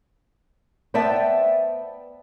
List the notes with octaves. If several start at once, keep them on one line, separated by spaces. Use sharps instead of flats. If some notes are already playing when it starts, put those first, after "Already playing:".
B3 C5 D5 E5 G5 A5